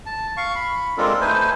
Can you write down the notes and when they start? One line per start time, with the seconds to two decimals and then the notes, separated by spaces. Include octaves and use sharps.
0.06 A5
0.37 F5 C#6
0.55 B5
0.98 G#3 C4 D4 F4 A4 A#4
1.21 A3 D#4 B4 C5 G#5